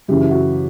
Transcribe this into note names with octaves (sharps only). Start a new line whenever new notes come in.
F#2 C#3 E3 G4
E4
F#4